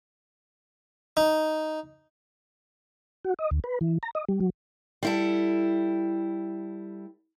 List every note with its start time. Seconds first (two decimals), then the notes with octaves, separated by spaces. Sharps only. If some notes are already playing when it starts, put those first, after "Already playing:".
1.17 D#4
3.24 F#4
3.39 D#5
3.51 D2
3.64 B4
3.81 E3
4.03 A#5
4.15 D#5
4.29 G3
4.40 F#3
5.03 G3 E4 A4